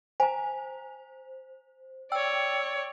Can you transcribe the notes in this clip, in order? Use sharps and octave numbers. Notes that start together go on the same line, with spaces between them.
C5 G#5 A#5
C#5 D5 G5 E6